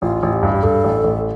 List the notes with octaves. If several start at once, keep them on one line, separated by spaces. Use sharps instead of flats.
A1 F4
A1
G4
G2
G4
G2 A4
A1
A1